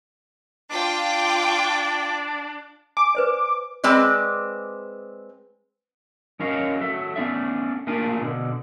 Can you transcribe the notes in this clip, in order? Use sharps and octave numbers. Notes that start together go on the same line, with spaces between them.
D4 F4 G5 D6
G#5 D6
B4 C5 D5
G#3 C4 B4 D5
F#3 C#4 A#4 C#5 D#5 F5
F#3 A4 E5
A3 B3 C#4 D4 E5
A3 A#3 D4 F4 A#4 G#5
B2 D3